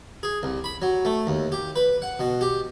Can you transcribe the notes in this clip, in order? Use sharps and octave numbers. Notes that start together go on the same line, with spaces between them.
G#4
C2
B5
F#3
A3
D#2
G4
B4
F#5
B2
G4